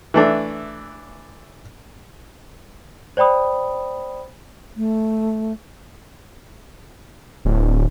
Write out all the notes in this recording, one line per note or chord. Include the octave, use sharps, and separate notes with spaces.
E3 A3 D4
C5 D5 G5 B5 D#6
A3
D1